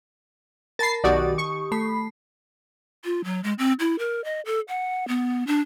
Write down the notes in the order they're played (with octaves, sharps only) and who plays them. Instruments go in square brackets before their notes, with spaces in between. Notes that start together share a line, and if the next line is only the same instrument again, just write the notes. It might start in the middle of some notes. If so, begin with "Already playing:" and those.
[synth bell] A#4 A5 B5 [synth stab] A6 C7
[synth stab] B1 F#4 D5 [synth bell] D#3 G4 D#6
[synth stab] C#6
[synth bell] A3 B5 C7
[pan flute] F4
F#3
G#3
C4
E4
A#4
D#5
A4
F#5
B3
D4